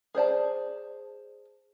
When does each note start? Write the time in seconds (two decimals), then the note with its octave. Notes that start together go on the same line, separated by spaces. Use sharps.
0.15 G#4 C5 D5 A5